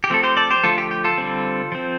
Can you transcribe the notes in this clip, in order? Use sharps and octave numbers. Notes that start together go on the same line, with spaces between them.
G4
F3 A3 C4 A4
G4 C5
A4 D5
G4 C5
D3 F3 A3 F4 A4
G4
G4
F4 A4
D3 G3 C4
F3 C4